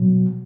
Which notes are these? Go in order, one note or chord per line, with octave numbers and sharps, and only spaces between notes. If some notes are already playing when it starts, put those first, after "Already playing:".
Already playing: B2 F#3